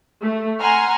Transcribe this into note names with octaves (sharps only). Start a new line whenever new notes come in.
A3
F#5 G#5 A#5 C6 F6